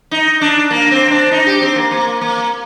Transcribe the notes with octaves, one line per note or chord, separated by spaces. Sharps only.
D#4
D4
A#3
C4
D4
D#4
G4
C4
A#3
A#3
A#3